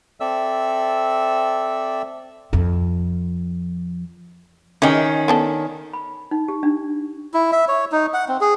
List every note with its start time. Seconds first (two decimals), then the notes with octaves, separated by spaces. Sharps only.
0.20 C4 A4 D5 E5 E6
2.53 F2 F3
4.82 D#3 E3 C#4 G4 G#4
5.28 B3 D4 A4
5.93 B5
6.31 D#4
6.48 G4
6.63 D4
7.34 E4
7.52 E5
7.68 C#5
7.92 D#4
8.14 F#5
8.28 C4
8.41 G#4